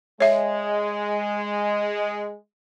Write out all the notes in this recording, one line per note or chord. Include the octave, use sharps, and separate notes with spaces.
G#3 C#5 E5